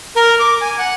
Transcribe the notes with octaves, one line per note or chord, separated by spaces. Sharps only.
A#4
D6
G#5
F#5